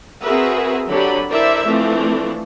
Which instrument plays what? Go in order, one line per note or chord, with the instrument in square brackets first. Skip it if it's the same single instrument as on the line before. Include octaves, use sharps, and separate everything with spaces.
[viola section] C4 F#4 G#4 A#4 B4 E5
D3 F#3 D4 G4 B5
E4 A4 A#4 C5 D5 E5
E3 F3 A3 C4 D4